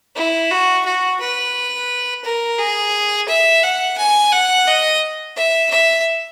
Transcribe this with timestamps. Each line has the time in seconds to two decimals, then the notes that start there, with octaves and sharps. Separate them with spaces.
0.16 E4
0.51 F#4
0.85 F#4
1.20 B4
2.24 A#4
2.59 G#4
3.29 E5
3.63 F#5
3.98 G#5
4.32 F#5
4.67 D#5
5.37 E5
5.71 E5